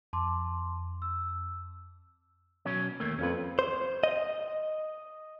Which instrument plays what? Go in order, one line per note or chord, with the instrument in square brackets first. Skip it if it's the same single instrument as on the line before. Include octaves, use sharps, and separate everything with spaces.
[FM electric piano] F2 [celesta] A5 C6 D6
[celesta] E6
[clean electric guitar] B2 F#3 C#4
D#2 A3 A#3
[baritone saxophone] F2 [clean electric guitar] C#4 B4
[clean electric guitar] C5
D#5